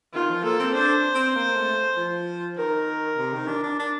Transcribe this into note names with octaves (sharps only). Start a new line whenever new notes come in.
D#3 F4
F3
A#3 A4
C4
D4 C5
C4
A#3
A3
F3
D#3 A#4
C3
D#3
D4
D4
D4